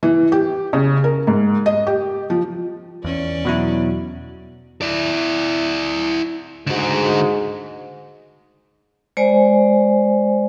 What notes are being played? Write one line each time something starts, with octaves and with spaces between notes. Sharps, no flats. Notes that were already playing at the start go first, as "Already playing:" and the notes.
E3
G4
C#3
A#4
G#2
D#5
G4
F3
E2 C#4 D5
B2 F#3 E4
E4 D5
G#2 D3 F#4
G#3 C5 D5 G#5